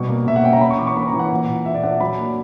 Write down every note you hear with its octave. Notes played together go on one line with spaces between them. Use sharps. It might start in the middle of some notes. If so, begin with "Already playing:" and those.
Already playing: B2 G3 C#6
A#3
B2 E5
F#5
C#4 G5
A#5
C#4 B5
C#6
E3 D6
C#6
A#3 B5
A#5
E3
F#5
A#2
A#2
A#2 E5
D5
D4 F#5
F#3 B5
A#3